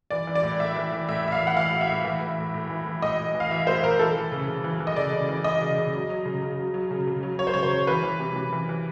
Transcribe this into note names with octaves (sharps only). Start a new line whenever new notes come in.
E3 D5
E3
D5
A2
A2 E5
E3
E3
A2 E5
A2 E5
F5
E3
F#5
E3 F5
A2
E5
A2
E3
E3
A2
A2
E3
E3
A2 D#5
A2
E3
F5
E3 E5
A2 C5
A2 A#4
E3 A4
E3
C#3
C#3
E3
E3
D#5
C#3 D5
C#3
E3
E3 D#5
C#3
C#3
F#3
F#3
C#3
C#3
F#3
F#3
C#3
C#3
F#3
F#3 C#5
C5
C#3 C#5
C5
C#3
E3 B4
E3
C3
C3
E3
E3